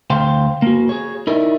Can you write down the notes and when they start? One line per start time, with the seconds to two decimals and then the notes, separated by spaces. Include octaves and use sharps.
0.10 D2 C5 F5 G5 C6
0.62 A#3 F#4
0.89 G#4 C#5
1.27 D#4 E4 A#4 D5